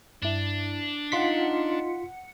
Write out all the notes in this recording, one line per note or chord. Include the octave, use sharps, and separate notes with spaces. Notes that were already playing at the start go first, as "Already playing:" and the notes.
G2 D4 E4
D#4 F4 F#5 C6 B6 C#7